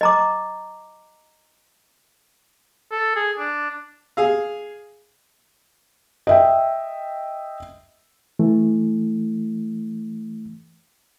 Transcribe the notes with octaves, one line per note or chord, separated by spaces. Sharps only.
D#5 A#5 D6
A4
G#4
D4
G#4 F5
D#5 E5 G5
E3 A3